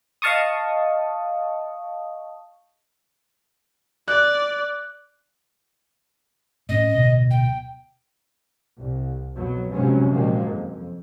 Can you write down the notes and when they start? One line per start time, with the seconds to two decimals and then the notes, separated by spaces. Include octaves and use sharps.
0.22 D#5 F5 A5 C#6 D#6
4.08 D5 F#6
6.69 A2 C#4 D#5
6.95 D1 B2
7.31 G5
8.76 C2
9.35 F2 B2 F#3 B3
9.73 C3 F3 F#3 G#3 B3 C#4
10.10 A#2 D#3 F3 F#3 G#3 A#3
10.45 F2